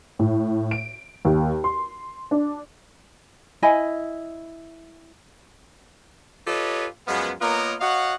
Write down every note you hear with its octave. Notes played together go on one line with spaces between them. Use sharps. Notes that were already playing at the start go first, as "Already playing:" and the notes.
A2
D7
D#2
C6
D4
E4 D#5 G#5 B5
F4 G4 A4 B4 C#5 D#5
F#2 F3 G#3 B3
A#3 B3 F4 A#4 C#5 D#5
F#4 C#5 D#5 F5 F#5